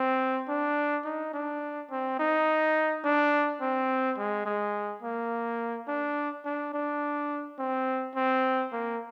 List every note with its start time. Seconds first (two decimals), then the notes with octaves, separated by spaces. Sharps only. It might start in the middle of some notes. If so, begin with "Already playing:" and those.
Already playing: C4
0.49 D4
1.05 D#4
1.33 D4
1.91 C4
2.19 D#4
3.04 D4
3.61 C4
4.18 G#3
4.46 G#3
5.03 A#3
5.88 D4
6.45 D4
6.73 D4
7.59 C4
8.15 C4
8.73 A#3